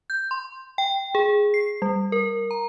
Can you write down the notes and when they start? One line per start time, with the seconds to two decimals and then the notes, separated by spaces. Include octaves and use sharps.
0.10 G6
0.31 C6
0.78 G5
1.15 G#4
1.54 C7
1.82 G3
2.12 A#4
2.51 A#5